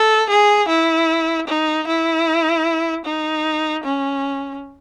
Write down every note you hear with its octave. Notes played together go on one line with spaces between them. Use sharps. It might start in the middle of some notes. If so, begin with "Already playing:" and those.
Already playing: A4
G#4
E4
D#4
E4
D#4
C#4